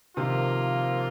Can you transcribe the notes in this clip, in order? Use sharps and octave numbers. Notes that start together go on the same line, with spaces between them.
C3 D#3 F3 A#3 F4